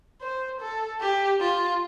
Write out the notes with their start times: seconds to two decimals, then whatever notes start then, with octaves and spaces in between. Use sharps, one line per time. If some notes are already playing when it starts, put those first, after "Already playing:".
0.21 C5
0.61 A4
1.01 G4
1.40 F4